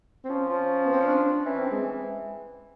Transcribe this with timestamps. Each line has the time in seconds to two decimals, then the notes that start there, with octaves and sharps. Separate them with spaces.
0.25 C4
0.29 F3 C#4
0.49 F3
0.86 B3
0.92 C4
1.00 C#4
1.07 D4
1.46 E3 C#4
1.58 C4
1.71 G#3